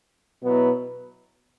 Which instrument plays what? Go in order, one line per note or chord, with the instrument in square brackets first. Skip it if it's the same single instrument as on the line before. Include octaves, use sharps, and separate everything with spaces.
[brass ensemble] B2 F#3 B3 E4